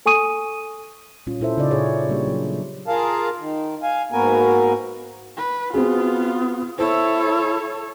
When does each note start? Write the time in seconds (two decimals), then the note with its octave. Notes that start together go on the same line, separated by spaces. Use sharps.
0.06 A4 G#5 C#6 D#6 D#7
1.27 A#2 G3 C#4 F4
1.41 A#2 E4 A4 C5 E5
1.57 C#3 D#4 F4 D5 D#5
1.71 A#2 G#4 C#5
2.09 G3 A#3 D4 G4
2.27 F#3
2.87 F4 G#4 A#4 F5 A5
3.39 D#3
3.83 F5 G#5
4.12 G#2 A#3 B3 F#4 A#4 G#5
5.37 B4
5.74 B3 C4 F4 F#4 G#4
6.79 E4 A4 C5 C#5